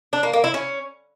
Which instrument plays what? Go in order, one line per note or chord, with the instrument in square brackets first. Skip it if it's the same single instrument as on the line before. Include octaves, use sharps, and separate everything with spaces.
[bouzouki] D4
A#3
A#3
E4
C#4